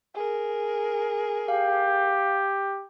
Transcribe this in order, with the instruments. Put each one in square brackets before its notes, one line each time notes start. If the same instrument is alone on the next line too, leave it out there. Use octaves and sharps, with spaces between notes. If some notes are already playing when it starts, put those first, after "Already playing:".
[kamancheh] G#4 A#4
[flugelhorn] G4 [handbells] F5